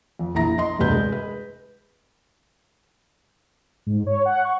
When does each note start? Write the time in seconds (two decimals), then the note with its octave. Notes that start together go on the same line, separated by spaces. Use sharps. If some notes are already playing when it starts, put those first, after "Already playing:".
0.19 F2
0.34 A#1 E3 E4 A#5 A#6
0.58 D#5 C6
0.79 D2 G2 C3 B4 G6
0.91 G#3
1.12 B4
3.87 G#2
4.07 C#5
4.25 F#5
4.45 C#6